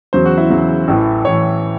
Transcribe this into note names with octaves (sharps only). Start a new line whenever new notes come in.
E2 C#3 F#3 C5
F#4
E4
E2 C#3 F#3
A1 A2 E3
A1 A2 E3 C#5